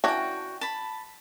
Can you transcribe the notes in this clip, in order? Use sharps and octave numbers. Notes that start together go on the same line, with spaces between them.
E3 C#4 D4 F#4 G5
A5 B5